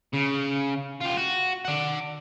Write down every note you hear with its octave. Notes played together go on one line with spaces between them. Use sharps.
C#3
F4 G4
F#4
D5 F#5